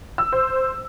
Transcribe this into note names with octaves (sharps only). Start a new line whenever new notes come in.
E6
C5